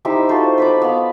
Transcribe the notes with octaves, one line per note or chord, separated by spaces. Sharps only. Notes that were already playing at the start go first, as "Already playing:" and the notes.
D#4 E4 G4 C5
F4 F#4 A4 C5
B4 B5 D6
B3 F5